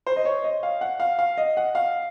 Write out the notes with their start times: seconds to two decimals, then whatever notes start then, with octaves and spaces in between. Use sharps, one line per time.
0.07 C5
0.16 D#5
0.25 C#5
0.44 D#5
0.63 F5
0.81 F#5
1.00 F5
1.19 F5
1.37 D#5
1.57 F#5
1.75 F5